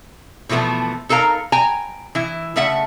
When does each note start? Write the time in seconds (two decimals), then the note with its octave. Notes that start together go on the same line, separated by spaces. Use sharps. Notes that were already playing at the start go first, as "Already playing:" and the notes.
0.49 B2 E3 F3 A3 B3
1.09 D#4 A4 A#4 F5 A#5
1.52 G5 G#5 A#5
2.15 E3 E4
2.56 C#3 A3 E5 F#5